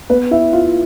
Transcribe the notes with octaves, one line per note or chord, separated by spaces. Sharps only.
B3 B4
E4 E5
F4 F5